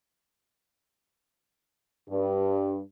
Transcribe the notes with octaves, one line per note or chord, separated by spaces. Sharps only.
G2